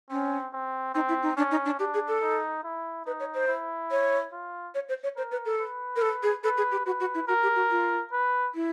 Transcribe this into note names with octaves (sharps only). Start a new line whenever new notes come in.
C4 C#4
C4
C4 D#4
E4
D#4
C#4 D4
D#4
D4
D4 G4
G#4
A4
D#4
E4
D#4 B4
C#5
C5
E4
C#5
F4
C#5
C5
C#5
A#4 C5
B4
A4
B4
A#4
A4
G#4
A4 B4
G#4
G4
F#4 B4
F#4
E4
F#4 A#4
G4
F#4
F4
B4
E4